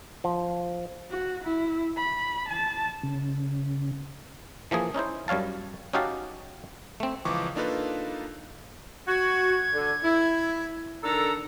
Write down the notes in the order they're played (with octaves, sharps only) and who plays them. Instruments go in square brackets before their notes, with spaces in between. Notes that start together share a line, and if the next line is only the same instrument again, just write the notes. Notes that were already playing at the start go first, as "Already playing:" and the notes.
[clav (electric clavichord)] F3
[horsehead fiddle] F#4
E4
B5
A5
[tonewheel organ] C#3
[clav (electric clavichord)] E3 F3 A#3 G#4
C#4 D#4 E4 C5
F#2 G3 C#5 F5 A5
C#4 D#4 F#4 G4 F5 A5
A3 C4
[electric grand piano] C#2 E3 F3 C#6 D6
A#3 D4 D#4 F4 A4 B4
[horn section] F#4 [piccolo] G#6
[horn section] D3
E4
[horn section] D#3 D4 A4 [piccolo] A#5